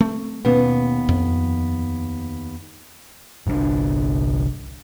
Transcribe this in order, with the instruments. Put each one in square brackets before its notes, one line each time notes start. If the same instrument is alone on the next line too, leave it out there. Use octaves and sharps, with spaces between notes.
[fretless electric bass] A3 C4
[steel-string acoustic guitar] D#2 B3 [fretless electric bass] B2 A#3 C#4
[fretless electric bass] F2
[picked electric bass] G1 C2 C3 D4